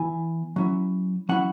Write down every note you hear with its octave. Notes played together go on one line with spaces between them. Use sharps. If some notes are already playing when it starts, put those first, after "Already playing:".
Already playing: E3 B3 E4 G#5
F#3 C#4 E4
F#3 C#4 E4 F#5